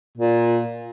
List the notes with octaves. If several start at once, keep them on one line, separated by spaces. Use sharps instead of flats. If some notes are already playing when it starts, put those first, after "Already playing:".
A#2